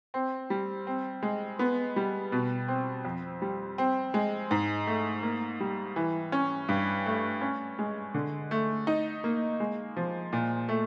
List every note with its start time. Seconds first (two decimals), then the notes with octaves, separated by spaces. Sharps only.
0.14 C4
0.50 G3
0.87 C4
1.23 G#3
1.59 B3
1.96 G3
2.32 B2
2.68 C4
3.05 F2
3.42 G3
3.78 C4
4.14 G#3
4.51 G#2
4.87 A3
5.23 A#3
5.60 G3
5.96 E3
6.32 C#4
6.69 G2
7.06 A3
7.41 C#4
7.79 G#3
8.14 D3
8.51 A3
8.87 D#4
9.24 A#3
9.60 G#3
9.96 F3
10.33 A#2
10.69 A3